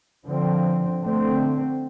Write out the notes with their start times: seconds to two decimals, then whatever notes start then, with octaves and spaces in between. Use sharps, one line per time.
0.26 D3 F3 C4
1.02 D3 A3 C4